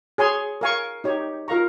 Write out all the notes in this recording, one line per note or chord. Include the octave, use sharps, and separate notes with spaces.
G#4 C#5 G#5 C6
A#4 F5 G#5 C#6
D#4 G4 C#5
F4 A#4 F5 A#5 C#6